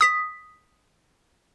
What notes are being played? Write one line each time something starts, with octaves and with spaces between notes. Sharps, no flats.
D#6 B6